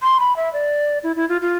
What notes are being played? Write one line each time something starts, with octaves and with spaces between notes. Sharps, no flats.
C6
B5
E5
D5
E4
E4
F4
F4